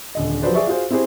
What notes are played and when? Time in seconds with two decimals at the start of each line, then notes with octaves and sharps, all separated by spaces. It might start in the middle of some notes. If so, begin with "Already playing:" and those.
0.15 D#1 D3 D#5
0.42 F3 F#3 G4 B4 C5 D5
0.55 G#4 D5 E5 C#6
0.67 F4 F#4 G#4 C5
0.90 C4 E4 G4 G#4 C5